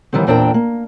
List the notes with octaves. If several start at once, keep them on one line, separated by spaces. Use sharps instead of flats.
D#3 E3 G3 B3 C4
E2 A#2 C4 D4 A#4 G5
A#3